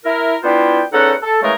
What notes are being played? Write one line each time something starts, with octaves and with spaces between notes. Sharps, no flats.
E4 A#4
B3 D4 E4 F4 C5 G5
E2 C#4 D#4 A4 F#5
A4
C#3 E3 G#3 A3 G#4 A#4